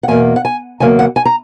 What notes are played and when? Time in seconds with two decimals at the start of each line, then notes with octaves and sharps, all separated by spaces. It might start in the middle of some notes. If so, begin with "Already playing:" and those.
0.03 F#5
0.08 E2 B2 A#3 G#5
0.36 F#5
0.45 G#5
0.80 E2 C#3 F#3 A#3 G#5
0.99 F#5
1.16 G#5
1.25 A#5